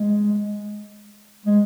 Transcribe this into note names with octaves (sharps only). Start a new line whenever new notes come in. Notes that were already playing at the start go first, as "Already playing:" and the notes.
Already playing: G#3
G#3